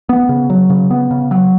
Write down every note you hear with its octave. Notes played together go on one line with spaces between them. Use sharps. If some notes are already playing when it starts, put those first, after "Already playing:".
B3
C#3
F#3
C#3
B3
C#3
F#3